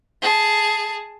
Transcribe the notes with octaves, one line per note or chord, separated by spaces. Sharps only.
G#4 A5